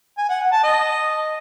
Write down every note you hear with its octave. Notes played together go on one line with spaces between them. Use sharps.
G#5
F#5
F#5
A5
D#5